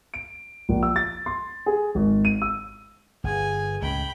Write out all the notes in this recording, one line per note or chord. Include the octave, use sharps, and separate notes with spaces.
D7
A#1
E6
A6
C6
G#4
G#1
D#7
E6
G1 G#4 G#5
C#2 A2 G5 B5